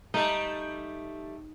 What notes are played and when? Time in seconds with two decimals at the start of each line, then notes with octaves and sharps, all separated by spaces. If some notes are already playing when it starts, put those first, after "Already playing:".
0.14 G3 A3 D#4 A4